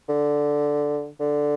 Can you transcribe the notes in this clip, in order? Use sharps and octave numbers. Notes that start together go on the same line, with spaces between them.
D3
D3